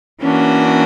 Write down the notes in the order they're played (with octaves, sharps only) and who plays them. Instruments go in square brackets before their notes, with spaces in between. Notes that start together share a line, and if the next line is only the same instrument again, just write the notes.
[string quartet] E3 A#3 D4 F#4 [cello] C#4